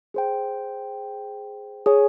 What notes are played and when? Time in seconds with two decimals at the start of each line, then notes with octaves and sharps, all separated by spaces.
0.14 G#4 C5 G5
1.86 G#4 C#5 G#5